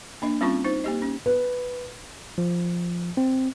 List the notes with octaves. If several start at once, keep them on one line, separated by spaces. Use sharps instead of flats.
A#3 D4 D#5
G3 C4 C#4 F4 C#6
D#4 C5
A#3 G4 D#5
C#4
B4
F3
C4